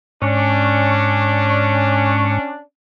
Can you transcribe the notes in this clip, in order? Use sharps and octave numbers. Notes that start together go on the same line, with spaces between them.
G#2 C#4 D4 C#6